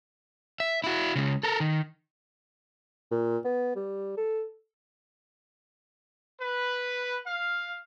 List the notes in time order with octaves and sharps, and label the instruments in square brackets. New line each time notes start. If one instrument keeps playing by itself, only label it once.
[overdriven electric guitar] E5
E4 F#4
C#3 G#3
A4 A#4
D#3
[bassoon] A#2
B3
G3
A4
[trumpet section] B4
F5